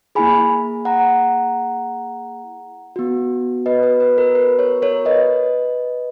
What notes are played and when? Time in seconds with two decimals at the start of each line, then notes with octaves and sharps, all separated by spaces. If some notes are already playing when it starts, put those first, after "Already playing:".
0.15 A#3 E4 G#4 G#5 B5
0.85 F#5 A#5
2.96 B3 F#4
3.66 B4 D#5
3.83 B4
4.00 B4
4.18 A#4
4.35 B4
4.59 A#4 C#5
4.82 A#4 C#5
5.05 B4 D#5